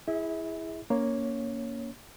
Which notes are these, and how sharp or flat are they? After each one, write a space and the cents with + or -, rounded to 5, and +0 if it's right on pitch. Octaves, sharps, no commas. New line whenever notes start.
E4 +0 G#4 -10 E5 -35
A#3 +0 C#4 +25 C#5 +0